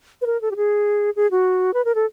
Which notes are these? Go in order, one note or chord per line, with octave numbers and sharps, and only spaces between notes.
B4
A#4
A4
G4
G#4
G#4
F#4
B4
A#4
A4